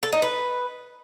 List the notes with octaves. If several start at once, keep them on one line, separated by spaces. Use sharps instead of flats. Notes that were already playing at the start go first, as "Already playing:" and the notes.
A4
D#4
B4